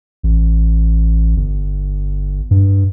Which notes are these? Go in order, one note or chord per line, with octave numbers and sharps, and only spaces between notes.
A1
G1
G2